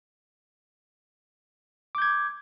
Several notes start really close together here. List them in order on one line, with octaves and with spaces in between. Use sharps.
D6 G6 G#6